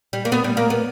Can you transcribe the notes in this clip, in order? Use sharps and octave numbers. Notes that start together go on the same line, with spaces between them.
G3
A#3
B3
G3
A#3
B3